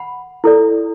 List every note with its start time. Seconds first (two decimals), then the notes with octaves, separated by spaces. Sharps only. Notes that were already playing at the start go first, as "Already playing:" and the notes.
Already playing: F#5 B5
0.44 E4 A4 D5